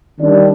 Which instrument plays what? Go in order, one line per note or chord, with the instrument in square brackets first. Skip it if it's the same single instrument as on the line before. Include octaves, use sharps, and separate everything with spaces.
[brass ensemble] D#3 G3 D4